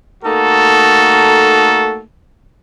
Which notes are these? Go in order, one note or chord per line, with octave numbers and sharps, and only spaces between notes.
A3 A#3 D#4 F#4 A4